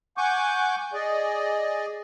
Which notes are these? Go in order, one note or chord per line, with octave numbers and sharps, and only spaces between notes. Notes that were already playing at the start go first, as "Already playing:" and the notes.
F#5 G#5 C#6 D6 G6
G#4 D5 D#5